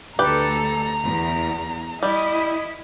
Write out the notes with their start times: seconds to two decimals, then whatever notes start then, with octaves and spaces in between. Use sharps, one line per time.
0.19 D2 G4 A4 B4 A#5
1.04 E2
2.03 G3 E4 D#5